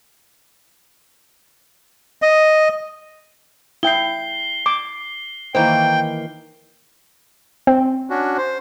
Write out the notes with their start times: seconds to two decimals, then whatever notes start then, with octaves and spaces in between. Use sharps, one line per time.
2.22 D#5
3.83 E4 G5 C7 G7
4.66 D6
5.55 D#3 E3 A#3 C5 G5
7.67 C4
8.10 C#4 D4 F#4
8.37 C5